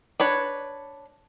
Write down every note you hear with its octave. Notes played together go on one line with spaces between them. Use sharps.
D4 B4 C#5